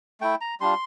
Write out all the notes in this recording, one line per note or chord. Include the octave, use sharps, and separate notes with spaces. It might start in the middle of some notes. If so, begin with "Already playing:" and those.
A3 E4 G5
A#5
G3 D4 F4 C6